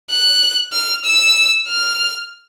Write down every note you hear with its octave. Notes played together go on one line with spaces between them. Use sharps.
F#6
F6
E6
F6